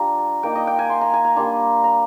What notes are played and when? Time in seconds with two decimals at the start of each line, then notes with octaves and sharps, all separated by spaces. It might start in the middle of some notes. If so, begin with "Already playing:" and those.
Already playing: G3 D4 F4 A#5
0.43 A#3 D#4 G5
0.55 D#5
0.67 G5
0.79 G#5
0.89 C6
1.01 A#5
1.14 G#5
1.25 A#5
1.36 G3 A#3 D4 C6
1.84 A#5